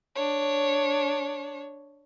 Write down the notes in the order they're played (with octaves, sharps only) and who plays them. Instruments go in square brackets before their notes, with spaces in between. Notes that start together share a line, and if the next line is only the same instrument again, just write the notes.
[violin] D4 C#5